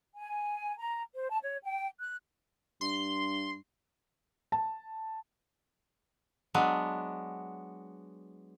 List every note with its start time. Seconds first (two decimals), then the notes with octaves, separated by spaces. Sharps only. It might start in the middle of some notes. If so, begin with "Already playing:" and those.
0.17 G#5
0.78 A#5
1.13 C5
1.30 A5
1.42 C#5
1.63 G5
1.99 F#6
2.81 G2 C6
4.52 A5
6.54 F#3 G#3 B3 D4